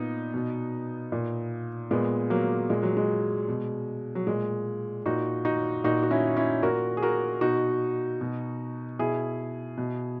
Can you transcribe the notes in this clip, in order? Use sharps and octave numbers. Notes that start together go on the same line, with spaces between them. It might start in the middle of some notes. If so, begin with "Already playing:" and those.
Already playing: A#2 B3 D#4
B2
A#2
A#2 G#3 B3
F#3 A#3
A#2 G#3
F#3
G#3
B2
F#3
A#2 G#3
A#2 D#4 F#4
D#4 F#4
A#2 D#4 F#4
F#4
C#4 E4
C#4 E4
A#2 F#4 A#4
G#4
F#4 A#4
B2 D#4 F#4
B2
B2 E4 G#4
B2